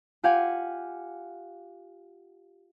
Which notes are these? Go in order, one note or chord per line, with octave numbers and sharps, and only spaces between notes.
F4 G4 F5 F#5 G#5